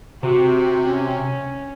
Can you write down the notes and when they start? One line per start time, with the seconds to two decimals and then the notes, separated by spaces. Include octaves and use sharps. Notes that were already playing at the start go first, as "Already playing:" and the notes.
0.23 C3 F#4
0.87 C#4